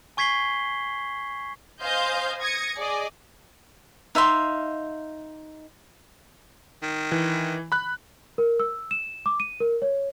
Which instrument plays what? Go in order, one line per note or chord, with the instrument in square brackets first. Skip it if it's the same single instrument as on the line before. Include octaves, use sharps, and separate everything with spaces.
[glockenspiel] G#5 C#6 G#6 B6 C7 G7
[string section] C5 D#5 F5 G#5 C6 G6
D#6 G#6 A#6 C#7
G#4 D5 D#5
[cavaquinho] D#4 E5 F5 C6
[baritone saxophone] D#3
[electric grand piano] E3
B5 F#6
[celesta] A#4
E6
E7
D6
D#7
A#4
C#5